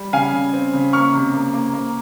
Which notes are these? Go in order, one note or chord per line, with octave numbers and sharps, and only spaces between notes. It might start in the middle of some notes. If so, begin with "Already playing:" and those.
Already playing: G3
C#3 F5 G#5
C#3
C4
C#3
A#3 C#6 F6
C3
A#3
A#3
A#3